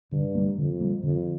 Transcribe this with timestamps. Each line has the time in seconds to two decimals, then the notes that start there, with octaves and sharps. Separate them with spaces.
0.12 G2 D3
0.35 G3 A#3
0.58 F2 D3
0.80 G3 A#3
1.03 F2 D3